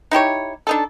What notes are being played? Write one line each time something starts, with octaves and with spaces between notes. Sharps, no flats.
D#4 E4 G4 C#5
D4 D#4 A4